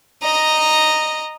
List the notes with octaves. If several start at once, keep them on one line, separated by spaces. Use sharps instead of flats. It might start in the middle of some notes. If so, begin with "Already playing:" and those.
D#5 A#5